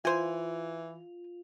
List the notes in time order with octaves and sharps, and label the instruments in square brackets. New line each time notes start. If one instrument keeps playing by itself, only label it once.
[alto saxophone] E3 [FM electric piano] F4 [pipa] C5 G#5